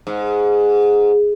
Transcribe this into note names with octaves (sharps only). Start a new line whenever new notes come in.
G#2